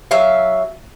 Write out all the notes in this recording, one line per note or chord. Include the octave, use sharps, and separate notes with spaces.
F#3 E5 F5